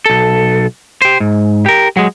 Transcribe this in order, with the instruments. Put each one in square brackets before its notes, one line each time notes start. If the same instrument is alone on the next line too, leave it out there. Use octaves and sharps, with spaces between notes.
[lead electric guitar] B1 A4
G4 C5
G#2
G4 A#4
F#3 G#3